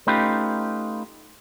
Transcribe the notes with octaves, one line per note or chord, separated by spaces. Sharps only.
A3 C#4 D#4 F4 G4 B4